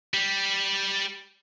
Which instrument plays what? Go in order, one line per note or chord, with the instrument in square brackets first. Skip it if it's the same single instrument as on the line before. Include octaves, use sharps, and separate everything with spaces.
[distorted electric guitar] G3